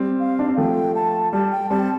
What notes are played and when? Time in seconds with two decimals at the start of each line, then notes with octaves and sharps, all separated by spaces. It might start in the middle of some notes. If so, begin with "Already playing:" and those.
Already playing: G3 C4
0.20 F5
0.39 D4
0.48 C4
0.58 F3 A3 G5
0.95 A5
1.33 G3 A5
1.52 G5
1.70 G3 C4 A5